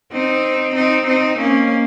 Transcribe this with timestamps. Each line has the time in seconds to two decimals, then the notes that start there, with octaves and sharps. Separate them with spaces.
0.12 C4 D#4
0.75 C4 D#4
1.06 C4 D#4
1.38 A#3 C#4